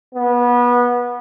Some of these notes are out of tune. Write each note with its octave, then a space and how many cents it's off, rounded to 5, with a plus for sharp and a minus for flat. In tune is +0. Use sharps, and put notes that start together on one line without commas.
B3 -25